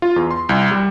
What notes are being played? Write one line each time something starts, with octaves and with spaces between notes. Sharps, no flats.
F4
E2
C6
C2
G3